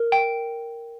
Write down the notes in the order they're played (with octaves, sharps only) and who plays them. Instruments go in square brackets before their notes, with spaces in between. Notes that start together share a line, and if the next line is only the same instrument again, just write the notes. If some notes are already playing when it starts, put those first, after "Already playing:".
Already playing: [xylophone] A#4
G5